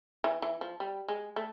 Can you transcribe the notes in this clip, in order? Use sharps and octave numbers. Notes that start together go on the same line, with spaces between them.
E3
E3
F3
G3
G#3
A3